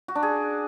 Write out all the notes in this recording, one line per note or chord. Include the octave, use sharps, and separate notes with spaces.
F#4
D4
G#4